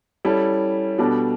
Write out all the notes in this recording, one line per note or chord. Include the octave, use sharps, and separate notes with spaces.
G3 C#4 E4 A4
B2 G3 B3 D4 A4